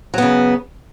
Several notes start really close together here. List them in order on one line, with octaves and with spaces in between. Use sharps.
F#3 B3 C#3